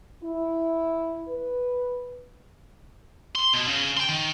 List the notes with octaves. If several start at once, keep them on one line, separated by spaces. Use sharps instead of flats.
E4
B4
C6
B2
C#3
G5 C6
D#3